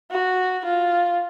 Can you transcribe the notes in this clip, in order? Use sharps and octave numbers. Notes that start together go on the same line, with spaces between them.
F#4
F4